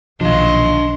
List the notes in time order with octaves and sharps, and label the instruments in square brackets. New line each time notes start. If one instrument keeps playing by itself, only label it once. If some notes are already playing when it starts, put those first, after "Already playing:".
[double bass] B1 [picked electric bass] A#2 D#3 F3 [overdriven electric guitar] D4 F5 [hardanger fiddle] D#5 C6